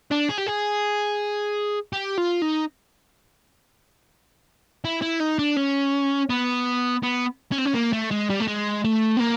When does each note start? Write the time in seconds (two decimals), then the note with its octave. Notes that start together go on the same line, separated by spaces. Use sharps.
0.11 D4
0.29 G#4
0.38 G4
0.47 G#4
1.93 G4
2.18 F4
2.42 D#4
4.85 E4
5.02 E4
5.20 D#4
5.39 D4
5.57 C#4
6.30 B3
7.03 B3
7.52 C#4
7.58 C4
7.66 C#4
7.75 A#3
7.93 A3
8.11 G#3
8.30 G3
8.40 A3
8.48 G#3
8.85 A3
9.17 B3
9.20 A#3